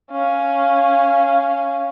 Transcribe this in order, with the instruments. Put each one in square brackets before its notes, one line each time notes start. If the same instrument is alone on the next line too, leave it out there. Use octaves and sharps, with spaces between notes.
[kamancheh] C#4 F5